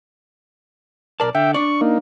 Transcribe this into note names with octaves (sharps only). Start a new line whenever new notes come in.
B1 A#4 D5 A5
D3 E5 G5
D4 D5 C#6
A#3 D#4